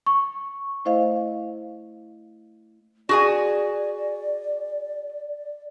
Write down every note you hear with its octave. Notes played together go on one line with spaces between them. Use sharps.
C#6
A3 E4 C5 D#5 F5
F#4 G#4 D5 G#5